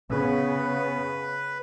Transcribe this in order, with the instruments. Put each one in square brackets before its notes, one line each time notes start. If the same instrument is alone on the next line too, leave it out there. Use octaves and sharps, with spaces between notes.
[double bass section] C#3 B3 [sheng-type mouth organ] B4